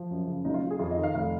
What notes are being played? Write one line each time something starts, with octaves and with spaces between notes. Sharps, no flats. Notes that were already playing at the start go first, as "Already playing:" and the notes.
Already playing: F3
F#2
C#3
F#1 D#4
F4
F#1
G#4
F2 F4
D#5
D#3
F5
F1 F5